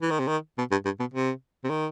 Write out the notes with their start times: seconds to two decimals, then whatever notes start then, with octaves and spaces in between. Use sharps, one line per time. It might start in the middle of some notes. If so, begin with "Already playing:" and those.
0.02 E3
0.11 D#3
0.19 C3
0.27 D#3
0.58 B2
0.71 G2
0.85 G2
1.00 B2
1.14 C3
1.64 C3
1.70 D#3